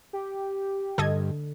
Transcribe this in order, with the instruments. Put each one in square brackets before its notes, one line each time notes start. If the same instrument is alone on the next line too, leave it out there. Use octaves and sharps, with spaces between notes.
[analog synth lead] G4
[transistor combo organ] G2 [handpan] D3 [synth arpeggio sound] A4 D#5 G#6